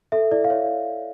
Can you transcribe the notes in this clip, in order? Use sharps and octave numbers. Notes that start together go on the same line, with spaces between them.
A4 E5
E4 D5
F5
C#5 E5